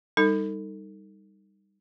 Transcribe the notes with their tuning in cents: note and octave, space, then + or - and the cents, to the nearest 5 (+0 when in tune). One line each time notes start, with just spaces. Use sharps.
G3 +10 D#4 +0 A4 +35